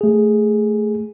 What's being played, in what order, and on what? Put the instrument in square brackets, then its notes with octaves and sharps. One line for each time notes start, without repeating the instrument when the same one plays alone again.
[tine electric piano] A3 G#4